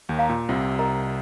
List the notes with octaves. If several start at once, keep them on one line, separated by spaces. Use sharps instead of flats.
D#2 D#3
F5 A#5
A#2
C2 C3 F4
A#4 D#5 A#5